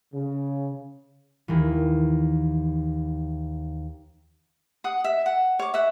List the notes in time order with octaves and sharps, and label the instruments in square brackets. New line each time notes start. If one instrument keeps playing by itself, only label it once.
[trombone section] C#3
[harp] D#2 E3
[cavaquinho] F#5 D#6
E5
F#5
C#5 D6
E5 F#5